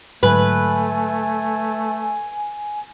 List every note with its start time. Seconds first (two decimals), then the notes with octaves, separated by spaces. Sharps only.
0.23 G#2 D3 F#3 A3 B4 G#5